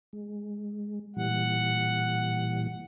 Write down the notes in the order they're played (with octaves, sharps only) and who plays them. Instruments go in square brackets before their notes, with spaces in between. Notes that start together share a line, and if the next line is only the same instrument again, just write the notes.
[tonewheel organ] G#3
[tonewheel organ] A#2 E3 G3 [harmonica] F#5